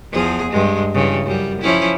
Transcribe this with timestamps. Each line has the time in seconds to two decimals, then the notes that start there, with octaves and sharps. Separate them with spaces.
0.12 E2 F3 G#4
0.51 G2 G#3
0.94 G2 C#3 E3
1.26 F#2 G3
1.62 F3 C#4 E4